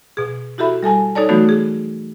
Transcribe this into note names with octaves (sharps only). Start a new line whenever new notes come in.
B2 G#4
E4 F#4 G4 A4 E5 B5
G3 A4 G#5 A5
D#4 A4 C#5 D5 A5
E3 F#3 A3 B3 D#4 F#4
G#4